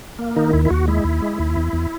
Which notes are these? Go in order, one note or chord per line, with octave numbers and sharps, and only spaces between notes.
A#3
D#3 D#4
D#2 E4
E4
D#2 F#4
G#3 E4
D#2
G#3
D#2
E2
E2